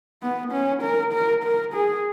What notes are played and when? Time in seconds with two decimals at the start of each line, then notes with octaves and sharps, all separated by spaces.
0.23 B3
0.52 C#4
0.83 A#4
1.13 A#4
1.44 A#4
1.74 G#4